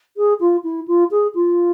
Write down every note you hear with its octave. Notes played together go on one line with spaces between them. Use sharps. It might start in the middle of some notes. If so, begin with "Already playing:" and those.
G#4
F4
E4
F4
G#4
F4